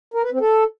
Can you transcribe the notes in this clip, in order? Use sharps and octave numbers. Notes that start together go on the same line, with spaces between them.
A#4
B4
C4
A4